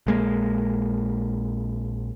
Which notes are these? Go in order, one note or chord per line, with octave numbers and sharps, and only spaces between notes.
A#1 G#3 A#3